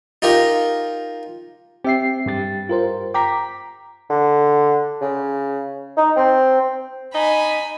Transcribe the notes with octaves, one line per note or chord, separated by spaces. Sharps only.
D#4 F4 G4 A#4 D#5
C4 G4 E5 C7
G2 G4 A6
F4 A#4 C5
G5 A#5 D6 B6
D3
C#3
D#4
C4
D#4 G#5 B5